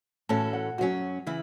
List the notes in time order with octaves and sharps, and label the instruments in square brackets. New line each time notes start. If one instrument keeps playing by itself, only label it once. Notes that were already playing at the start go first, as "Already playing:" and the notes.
[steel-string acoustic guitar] A2 E3 C#4 F#4 A4 [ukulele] A5
[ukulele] F#5
[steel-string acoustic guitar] F#2 F#3 C#4 [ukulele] F#4
[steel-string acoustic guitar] C#3 E3 E4